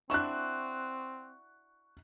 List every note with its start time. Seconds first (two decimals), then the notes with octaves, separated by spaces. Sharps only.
0.10 C4 D4 E4 F#4 C#6 F#6